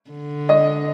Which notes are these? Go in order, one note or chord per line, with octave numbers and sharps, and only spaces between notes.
D3
D#5